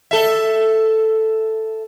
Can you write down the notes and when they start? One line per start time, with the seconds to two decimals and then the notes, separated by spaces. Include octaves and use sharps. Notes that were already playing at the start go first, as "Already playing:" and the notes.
0.11 A4 E5